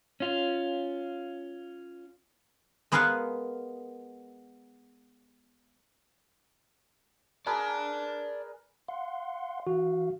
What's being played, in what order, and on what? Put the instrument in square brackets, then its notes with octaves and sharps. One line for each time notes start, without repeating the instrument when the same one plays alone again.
[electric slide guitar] C#4 F4
[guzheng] G#3 B3 G#4 A#4 F5 F#5
[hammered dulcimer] G#4 A#4 B4 [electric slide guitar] D5 A5
[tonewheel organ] F5 F#5 C6
[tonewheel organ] E3 F5 [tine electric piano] F#4